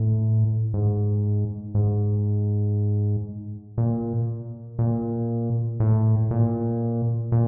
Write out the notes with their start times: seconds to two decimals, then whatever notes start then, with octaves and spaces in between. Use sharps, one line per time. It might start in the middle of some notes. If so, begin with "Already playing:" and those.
Already playing: A2
0.74 G#2
1.75 G#2
3.78 A#2
4.79 A#2
5.80 A2
6.31 A#2
7.32 A#2